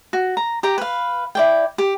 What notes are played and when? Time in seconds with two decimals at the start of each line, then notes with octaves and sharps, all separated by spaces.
0.13 F#4
0.37 A#5
0.63 G4 G5 A#5
0.78 B4 F5
1.35 E4 D5 G5
1.78 G4